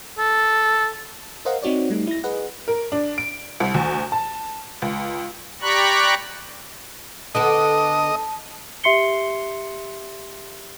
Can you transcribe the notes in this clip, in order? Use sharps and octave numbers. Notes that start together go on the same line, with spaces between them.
A4
A#4 C5 D#5 F5 F#5 C6
C4 D#4 F#4 C#5 D5
G3 A3 D#4
E4 A#6
G#4 B4 D#5 F#5
A#4
D4
D7
C2
D2
A5
C#2
G4 D5 A#5 B5 C#6 F#6
D3 B3 A4 D#5 A5
G4 E5 C6 C7 C#7 G7